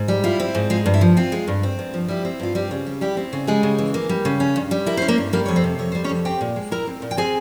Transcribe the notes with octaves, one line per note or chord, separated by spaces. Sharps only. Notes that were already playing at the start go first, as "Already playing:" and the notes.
Already playing: G#2
G3
E4 F4
C4
G#2
G#3 F4
G2
E4
F3
C4 F4
G#3
G2
C4
G2
F3
G3 E4 G4
C4
G2 F4
G3 C4 G4
C#3
G3
G3 E4 G4
C4
C#3
G3 G#3 G#4
C#3
E3
A#3
G3
C#3
C#4
G2
G3
E4 A#4
C#4 C5
A#3 A#4
G2
G3 A#3 A#4
F2 C#5
C4 C5
C3
F2 C#5
G3 C5
C#4 C#5
F2
C4 G4 G5
A#2
G#3
E4 A#4 A#5
C4
A#2
G5
C4 G#4 G#5